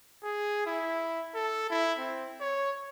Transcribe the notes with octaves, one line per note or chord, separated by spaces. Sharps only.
G#4
E4
A4
E4
C4
C#5